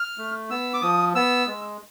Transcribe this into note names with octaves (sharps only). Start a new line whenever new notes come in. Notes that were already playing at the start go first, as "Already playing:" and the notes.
Already playing: F6
A3
B3 E6
D6
F3 D#6
B3 E6
G#3